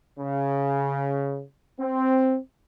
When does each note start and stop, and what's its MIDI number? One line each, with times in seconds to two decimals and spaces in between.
0.19 1.41 49
1.80 2.38 60